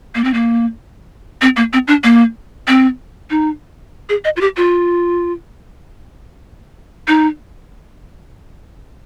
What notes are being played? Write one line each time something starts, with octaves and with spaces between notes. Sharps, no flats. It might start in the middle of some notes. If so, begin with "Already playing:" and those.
A#3
C4
A#3
C4
A#3
C4
D4
A#3
C4
D#4
G#4
D#5
F4
G4
F4
D#4